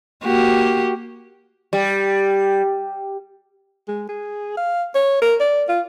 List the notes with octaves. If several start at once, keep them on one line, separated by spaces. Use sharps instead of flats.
A#3 F#4 G4
G3
G#3
G#4
F5
C#5
A#4
D5
F4